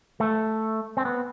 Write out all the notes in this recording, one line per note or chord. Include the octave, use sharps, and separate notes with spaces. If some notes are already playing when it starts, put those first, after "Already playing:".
A3
C4
B3